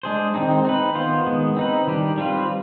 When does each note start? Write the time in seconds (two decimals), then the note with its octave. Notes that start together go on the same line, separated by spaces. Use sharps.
0.03 G#3 D4 G#4 C5
0.34 D#3 G#3 C4 D#4
0.65 C4 D#4 B4
0.95 D#3 B3 F4 C5
1.26 D#3 G#3 B3
1.57 C4 D#4 B4
1.87 D#3 G3 D4 G4
2.18 G3 C4 F4 B4